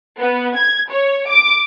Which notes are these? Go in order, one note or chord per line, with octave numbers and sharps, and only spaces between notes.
B3
G#6
C#5
D6